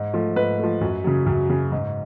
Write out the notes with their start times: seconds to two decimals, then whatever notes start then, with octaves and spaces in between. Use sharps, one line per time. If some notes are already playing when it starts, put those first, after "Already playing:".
Already playing: G#2
0.14 F3 A3
0.36 G#2 B4
0.59 F3 A3
0.81 F#2
1.04 C#3 F#3
1.26 F#2
1.49 C#3 F#3
1.72 G#2